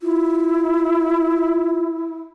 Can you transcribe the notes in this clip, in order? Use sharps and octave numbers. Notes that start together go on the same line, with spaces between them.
E4 F4